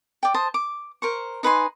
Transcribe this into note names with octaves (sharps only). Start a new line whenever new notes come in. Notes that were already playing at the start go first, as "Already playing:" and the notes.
D5 G5
C5 A5 D#6
D6
A#4 C5 C#6
D#4 B4 G#5 C6